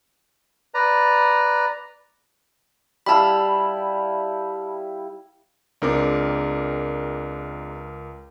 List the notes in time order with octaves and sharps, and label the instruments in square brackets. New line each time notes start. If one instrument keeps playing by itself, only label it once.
[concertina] B4 D5 A#5
[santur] G3 E4 F5 [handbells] A5 B5
[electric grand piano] C#2 A#4 D6 [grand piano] G#3 C4 D4